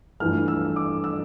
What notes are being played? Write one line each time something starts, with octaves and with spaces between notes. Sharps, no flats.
G2 E3 A3 F6
E6
D6
E6